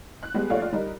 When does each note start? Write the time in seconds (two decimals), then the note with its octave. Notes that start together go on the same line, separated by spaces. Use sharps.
0.23 F#6
0.34 G3 G#3 B3 G4
0.50 A#1 A3 F4 C#5 D5 F5
0.61 F4 D5
0.73 G3 D#4 A#4